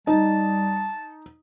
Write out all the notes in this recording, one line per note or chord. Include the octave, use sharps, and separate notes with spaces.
G3 D#4 A5